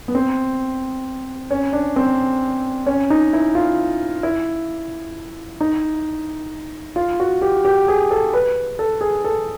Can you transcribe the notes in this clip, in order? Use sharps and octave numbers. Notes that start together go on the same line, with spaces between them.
B3
C4
C#4
D4
C4
C#4
D#4
E4
F4
E4
D#4
F4
F#4
G4
G4
G#4
A4
B4
A4
G#4
A4